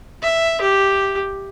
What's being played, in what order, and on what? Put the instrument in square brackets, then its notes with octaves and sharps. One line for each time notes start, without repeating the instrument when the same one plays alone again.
[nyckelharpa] E5
G4